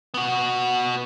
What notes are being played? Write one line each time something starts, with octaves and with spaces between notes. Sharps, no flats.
B3 F#4